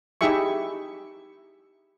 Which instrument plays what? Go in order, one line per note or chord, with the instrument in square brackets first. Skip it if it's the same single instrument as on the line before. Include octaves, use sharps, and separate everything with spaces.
[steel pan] D#4 E4 G4 G#4 E5 C#6